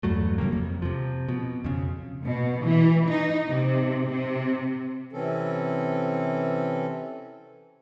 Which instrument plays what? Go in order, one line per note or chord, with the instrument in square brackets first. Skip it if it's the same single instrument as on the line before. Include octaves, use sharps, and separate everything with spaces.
[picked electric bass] E2 G2 F#3 A3
G#1 C#3 G3 A#3
F2
C3 F3
B2
F2 C#3
[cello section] B2
E3
D#4
C3
C3
[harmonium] C3 E3 C4 C#4 A4